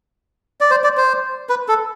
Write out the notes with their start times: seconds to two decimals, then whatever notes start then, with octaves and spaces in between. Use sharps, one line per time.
0.61 D5
0.71 C5
0.84 D5
0.97 C5
1.49 B4
1.68 A4